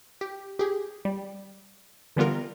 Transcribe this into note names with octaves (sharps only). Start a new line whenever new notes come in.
G4
G4 G#4
G3
D3 E3 G3 B3 F4 A#4